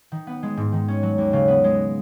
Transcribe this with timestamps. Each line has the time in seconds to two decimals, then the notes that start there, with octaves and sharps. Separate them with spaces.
0.12 D#3
0.27 B3
0.43 G#3
0.57 G#2
0.72 D#3
0.88 C#4
1.03 F#3
1.18 D#2
1.33 C#3
1.48 B3
1.64 G#3